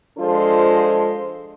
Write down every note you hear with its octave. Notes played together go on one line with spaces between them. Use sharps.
F3 G#3 D4 F4 A4 C5